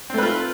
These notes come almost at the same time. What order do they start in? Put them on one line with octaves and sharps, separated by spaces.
C4 A3 B4 F4